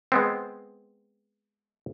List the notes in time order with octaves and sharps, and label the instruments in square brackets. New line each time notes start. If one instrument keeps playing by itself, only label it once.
[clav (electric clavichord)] G#3 B3 C4